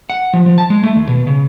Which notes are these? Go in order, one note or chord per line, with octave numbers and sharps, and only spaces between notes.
F#5
F3
F3
A5
G#3
A3
D#2
B2
C#3